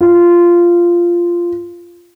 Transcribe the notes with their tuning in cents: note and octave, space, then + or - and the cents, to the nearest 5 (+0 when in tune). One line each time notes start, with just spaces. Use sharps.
F4 -10